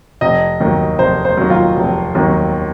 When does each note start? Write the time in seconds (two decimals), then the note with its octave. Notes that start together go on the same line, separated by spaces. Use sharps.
0.21 F1 D#5
0.60 D#2 D#3 F#3
0.99 F1 C5
1.25 C5
1.37 D#2 D#3 F#3
1.50 F4
1.76 F1
2.15 D#2 D#3 F#3